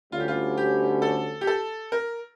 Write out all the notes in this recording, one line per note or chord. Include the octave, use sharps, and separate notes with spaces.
D2 D3 G3 C#4 F4
G4
F4
G4
A4
G4
A4
A#4